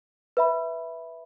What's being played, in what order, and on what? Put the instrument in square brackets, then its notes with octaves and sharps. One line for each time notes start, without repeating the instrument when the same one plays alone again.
[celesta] B4 E5 B5